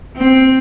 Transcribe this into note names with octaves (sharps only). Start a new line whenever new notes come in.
C4